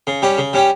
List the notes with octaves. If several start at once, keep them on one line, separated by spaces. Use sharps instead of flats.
C#3
G3 C#4 G4
C#3
G3 C#4 G4